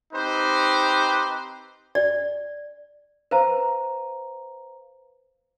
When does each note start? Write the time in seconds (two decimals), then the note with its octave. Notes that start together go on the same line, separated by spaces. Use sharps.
0.13 C4 D#4 G4 B4 C5
1.95 D5
3.31 B4 C5 F5 A#5